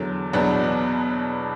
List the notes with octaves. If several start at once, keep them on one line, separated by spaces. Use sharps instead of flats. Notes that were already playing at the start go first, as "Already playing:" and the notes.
Already playing: E2 D3 F#3
E2 B2 F#3 B3 D4